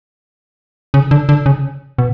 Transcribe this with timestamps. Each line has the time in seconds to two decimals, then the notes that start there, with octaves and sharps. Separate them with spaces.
0.94 C#3
1.11 D3
1.29 D3
1.46 C#3
1.98 B2